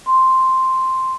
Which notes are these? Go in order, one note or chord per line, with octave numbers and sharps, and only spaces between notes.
C6